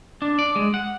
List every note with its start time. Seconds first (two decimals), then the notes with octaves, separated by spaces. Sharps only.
0.22 D4
0.39 D5
0.56 G#3
0.74 F#5